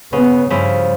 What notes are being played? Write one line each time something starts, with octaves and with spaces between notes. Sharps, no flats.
C#3 B3
G2 C#3 F3 E4